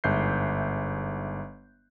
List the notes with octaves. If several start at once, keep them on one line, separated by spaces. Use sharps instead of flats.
G1 G#2 E5 F#6 G6 C7